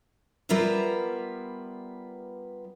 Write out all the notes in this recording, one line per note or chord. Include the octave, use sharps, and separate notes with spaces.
G3 B3 F4 A#4 B4 E5